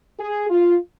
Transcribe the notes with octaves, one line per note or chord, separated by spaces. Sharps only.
G#4
F4